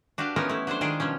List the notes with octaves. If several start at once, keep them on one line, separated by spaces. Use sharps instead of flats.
D4 F#4 G4 B4 F5 A5
E3 B3 C#4 D#4 F4 A#4
A3 E4
F#3 D4 A4 C5
D#3 G#3 D4 F4 G#4 D5
B2 F3 G3 C#4